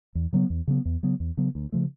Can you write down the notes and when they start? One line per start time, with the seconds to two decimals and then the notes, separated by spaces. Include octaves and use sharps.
0.15 E2
0.33 C#3 F#3 B3
0.50 E2
0.68 C#3 F#3 B3
0.85 E2
1.03 C#3 F#3 B3
1.20 E2
1.37 C#3 F#3 B3
1.55 D2
1.72 C#3 F3 A3